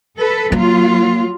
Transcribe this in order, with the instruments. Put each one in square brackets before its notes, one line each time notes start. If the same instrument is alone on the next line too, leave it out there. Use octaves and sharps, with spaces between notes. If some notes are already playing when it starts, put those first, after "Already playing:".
[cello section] A4 B4
[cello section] F#3 F4 [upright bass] A#3